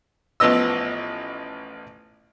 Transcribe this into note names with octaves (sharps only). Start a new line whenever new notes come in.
A1 F3 B3 D#5 E6